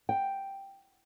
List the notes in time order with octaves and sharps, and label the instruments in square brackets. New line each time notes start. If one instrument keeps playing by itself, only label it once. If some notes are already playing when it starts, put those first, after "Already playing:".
[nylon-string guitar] G5